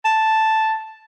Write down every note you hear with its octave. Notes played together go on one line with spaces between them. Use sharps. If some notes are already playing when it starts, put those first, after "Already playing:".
A5